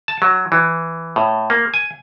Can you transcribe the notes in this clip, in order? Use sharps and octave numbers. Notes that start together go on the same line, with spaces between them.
A5
F#3
E3
A2
A#3
G#5